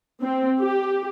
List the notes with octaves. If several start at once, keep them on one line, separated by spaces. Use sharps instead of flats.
C4
G4